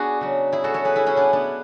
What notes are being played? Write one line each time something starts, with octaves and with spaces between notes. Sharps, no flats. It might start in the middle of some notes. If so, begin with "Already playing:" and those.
Already playing: B3 D4 F#4 G#4
C#3 F#3
E4 G#4
F#4 A4
A4 C#5
G#4 B4
E4 G#4
C#4 E4
B3 D4
B3 D4